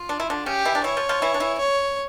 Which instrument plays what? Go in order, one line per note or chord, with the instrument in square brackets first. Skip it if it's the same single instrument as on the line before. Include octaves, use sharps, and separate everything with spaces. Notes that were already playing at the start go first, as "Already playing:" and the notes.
Already playing: [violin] F4
[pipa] D4
E4
D3 D4
[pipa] C#3 C#4 [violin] G4
[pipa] E3 E4
D4
[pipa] E3 E4 [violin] C#5
[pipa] F3 F4
F3 F4
E3 E4
D4
E3 E4
[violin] C#5